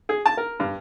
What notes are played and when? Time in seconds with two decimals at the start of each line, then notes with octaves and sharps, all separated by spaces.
0.09 G#4
0.26 A5
0.37 A#4
0.60 G2